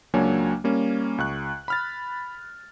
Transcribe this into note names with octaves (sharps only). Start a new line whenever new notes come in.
C#2 F#3 A#3 D4 C#5 G#5
G3 A#3 C#4
C#2 C#6 F#6
B5 F6 A6